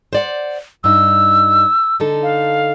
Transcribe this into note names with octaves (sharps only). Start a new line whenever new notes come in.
C5 D5 F#5
G2 D#4 E6
D3 D#4 A4
F5